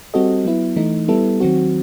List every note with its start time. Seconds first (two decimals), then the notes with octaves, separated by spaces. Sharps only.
0.14 G3 C4 F#4 A4 D#5
0.45 F#3 B3 E4
0.76 E3 A3 D#4
1.08 G3 B3 E4 A4
1.40 D#3 F#3 C4 F#4